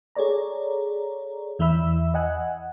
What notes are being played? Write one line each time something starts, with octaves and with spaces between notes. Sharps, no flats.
G#4 A4 C#5 D5 A#5
E2 E3 E5 B5 E6
D#5 F#5 G#5 F#6